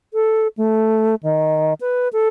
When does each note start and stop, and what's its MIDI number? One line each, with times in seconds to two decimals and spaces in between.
0.14 0.48 69
0.57 1.15 57
1.23 1.74 51
1.81 2.08 71
2.13 2.28 69